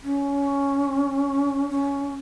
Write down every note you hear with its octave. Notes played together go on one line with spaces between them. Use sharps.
C#4
C#4